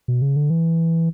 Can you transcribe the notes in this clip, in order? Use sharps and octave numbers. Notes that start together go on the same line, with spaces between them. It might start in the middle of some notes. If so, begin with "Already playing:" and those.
B2
C#3
D3
E3